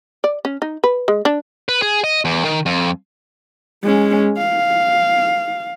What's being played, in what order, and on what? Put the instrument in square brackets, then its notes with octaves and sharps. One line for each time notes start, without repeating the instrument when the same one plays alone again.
[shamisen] D5
C#4
D#4
B4
G#3
D4
[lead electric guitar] B4
G#4
D#5
E2
D#3
F2
[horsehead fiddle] G#3 C#4
F5